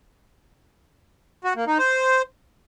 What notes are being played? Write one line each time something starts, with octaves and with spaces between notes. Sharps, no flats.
F#4
A#3
D#4
C5